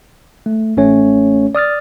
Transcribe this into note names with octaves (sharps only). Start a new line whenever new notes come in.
A3
A1 A3 C#4 C#5
D5 D#6 F6 A6